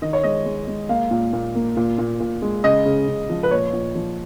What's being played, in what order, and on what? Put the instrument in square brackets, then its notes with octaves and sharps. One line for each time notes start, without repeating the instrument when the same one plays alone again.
[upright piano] D#3 D#5
C#5
G#3 D#5
G#3
G#3
A#3 F5
A#2
A#2
A#3
A#2
A#2
A#2
G#3
C#3 D#5
C#3
C#3
F3
B4
A#2 C#5
A#2
F3